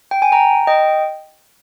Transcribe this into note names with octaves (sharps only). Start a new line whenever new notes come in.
G5
G#5
G5 A#5
D#5 G5